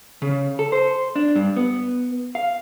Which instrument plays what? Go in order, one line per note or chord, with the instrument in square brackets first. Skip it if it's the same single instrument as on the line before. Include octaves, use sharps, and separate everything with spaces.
[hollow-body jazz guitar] C#3
A4
C5
D4
G2
B3
F5